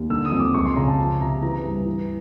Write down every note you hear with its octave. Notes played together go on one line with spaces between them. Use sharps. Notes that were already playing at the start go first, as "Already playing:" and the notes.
Already playing: D#2
D3 E6
D#6
F2
D6
C#2 C#6
C6
C#3 A#5
A5
F3 A5
C3 A#5
E3 A#5
G2
E3